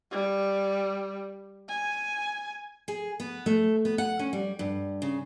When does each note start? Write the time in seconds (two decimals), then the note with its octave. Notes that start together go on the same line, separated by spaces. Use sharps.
0.11 G3
1.69 G#5
2.88 G#4
3.20 B3
3.46 A3
3.85 B3
3.98 F#5
4.19 C#4
4.33 G3
4.59 G2
5.02 C#3